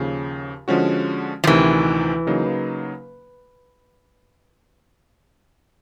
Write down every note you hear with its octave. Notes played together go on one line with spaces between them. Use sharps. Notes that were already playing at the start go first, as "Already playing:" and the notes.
Already playing: D#2 C#3 F3
D3 F3 G#3 C#4 F#4
F3
D2 C3 D#3 E3
C#3 F#3 A#3 D#4